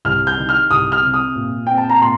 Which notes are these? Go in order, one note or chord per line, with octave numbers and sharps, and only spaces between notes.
C2 F6
G6
D#3
F6
C2 D#6
F6
C3
D#6
A#2
C4 G5
A5
A#5
A#2 C6